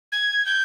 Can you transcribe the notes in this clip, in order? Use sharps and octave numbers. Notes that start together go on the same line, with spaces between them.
G#6
G6